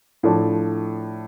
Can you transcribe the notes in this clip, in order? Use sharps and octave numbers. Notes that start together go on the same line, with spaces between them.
A2 F3 A3 D4